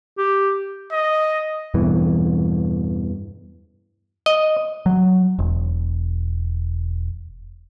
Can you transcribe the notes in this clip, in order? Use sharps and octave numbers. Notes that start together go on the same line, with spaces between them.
G4
D#5
E2 G2 B2 E3
D#5
F#3
E1